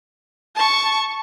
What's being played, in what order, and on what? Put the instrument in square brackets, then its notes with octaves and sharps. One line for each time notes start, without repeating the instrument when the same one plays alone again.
[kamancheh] A5 C#6